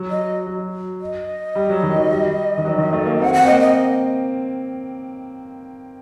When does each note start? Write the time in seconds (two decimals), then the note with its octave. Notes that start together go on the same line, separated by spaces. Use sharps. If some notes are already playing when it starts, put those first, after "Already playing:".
Already playing: F#3
0.10 D#5
0.47 F#3
1.01 D#5
1.55 G3
1.70 F#3
1.83 D#3
1.97 F#3
2.10 G3
2.58 D#3
2.65 F#3
2.78 D#3
2.93 A3
3.06 A#3
3.19 C4 F#5
3.34 F#5
3.42 C4
3.47 A#3 D#5
3.60 D#5